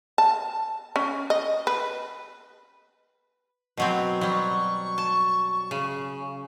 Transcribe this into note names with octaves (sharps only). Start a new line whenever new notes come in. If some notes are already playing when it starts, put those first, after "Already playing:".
A5
C#4
D#5
B4
B2 F#3 C4
F#3 G3 C#6
A5
C#3